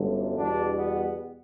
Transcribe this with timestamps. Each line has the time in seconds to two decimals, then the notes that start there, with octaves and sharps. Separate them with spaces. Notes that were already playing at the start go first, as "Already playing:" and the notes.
Already playing: G1 F#2 D3 G3
0.38 E2 B2 G3 D4
0.76 B3